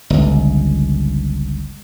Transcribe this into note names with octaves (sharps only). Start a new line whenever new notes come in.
G1 C#2